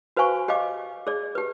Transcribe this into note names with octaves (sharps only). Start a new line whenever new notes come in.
F#4 B4 C5 F5 G#5 C#6
G4 D#5 F5 D6
G#4 D5
G4 B4